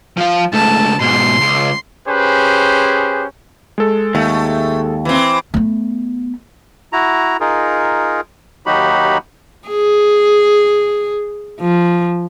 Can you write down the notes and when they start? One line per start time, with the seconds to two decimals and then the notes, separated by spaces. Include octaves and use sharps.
0.17 F3 F5
0.54 C#2 A3 A5
1.01 G#2 B2 C6
1.40 C#2
2.09 C#4 G4 G#4 B4 C5
3.78 G#3 A4
4.15 D#2 A3
5.05 E3 C4
5.54 A3 B3
6.93 E4 F#4 A#5
7.40 D#4 F4 G#4 A#4
8.66 D#2 F#3 D#4 F#4 G4 B5
9.69 G#4
11.60 F3